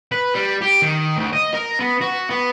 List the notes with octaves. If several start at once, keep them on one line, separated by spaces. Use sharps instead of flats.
B4
G3
G4
D#3
D2
D#5
A#4
B3
F#4
B3